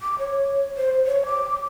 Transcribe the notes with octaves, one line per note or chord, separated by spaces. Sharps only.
D6
C#5
C5
C#5
D6